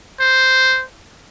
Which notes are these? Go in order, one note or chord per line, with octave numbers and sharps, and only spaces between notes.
C5